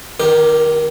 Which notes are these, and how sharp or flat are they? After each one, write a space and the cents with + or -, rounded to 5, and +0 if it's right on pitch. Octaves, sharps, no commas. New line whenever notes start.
D#3 -30 G4 +0 A#4 +25